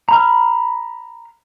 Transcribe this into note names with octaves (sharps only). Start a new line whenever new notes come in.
A#5 B5 F6